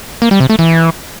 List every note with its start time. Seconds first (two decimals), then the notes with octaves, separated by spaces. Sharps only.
0.22 A#3
0.31 G3
0.40 C3
0.50 A3
0.59 E3